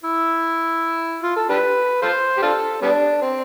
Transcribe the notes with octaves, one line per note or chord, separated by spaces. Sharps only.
E4
F4
A4
D4 G4 B4
F4 A4 C5
G4
D4 F4 A4
G3 B3 D4
C4